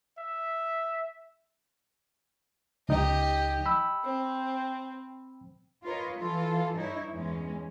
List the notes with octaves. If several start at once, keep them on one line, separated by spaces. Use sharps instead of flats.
E5
C#2 D#4 G4 D#5
B5 E6
C4
F4 A#4 B4 C#5 D#5
E3 F4 A4
G2 D#4 E4 C#5
E2 G#3 C#4